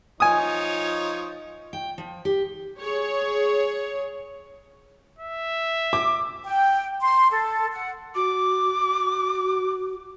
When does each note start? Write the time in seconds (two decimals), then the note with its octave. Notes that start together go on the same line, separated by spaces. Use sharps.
0.20 F3 D#4 C#5 G#5 D#6
1.73 G5
1.98 F3
2.25 G4
2.80 G#4 C#5
5.19 E5
5.93 D6
6.46 G5
7.01 C6
7.30 A4
7.73 F#5
8.15 F#4 D6